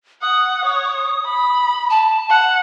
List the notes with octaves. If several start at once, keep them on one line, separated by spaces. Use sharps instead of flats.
F#5 D#6
C#5
B5
A5
F#5